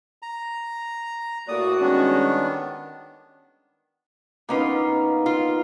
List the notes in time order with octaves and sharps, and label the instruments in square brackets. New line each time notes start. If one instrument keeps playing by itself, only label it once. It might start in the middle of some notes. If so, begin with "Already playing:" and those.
[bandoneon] A#5
[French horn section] A2 A#3 D5 [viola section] F#4 [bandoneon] D#6
[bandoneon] D#3 B3 D4 [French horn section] G3 G#3 C#4
[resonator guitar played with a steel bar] B2 C#4 F4 [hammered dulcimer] A#3 B3 D#4
[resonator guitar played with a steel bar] F4